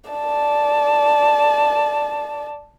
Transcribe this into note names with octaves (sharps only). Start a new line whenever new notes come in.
D5 A5